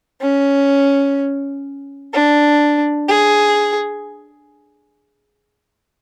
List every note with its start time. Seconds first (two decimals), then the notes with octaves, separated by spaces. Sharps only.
0.21 C#4
2.13 D4
3.08 G#4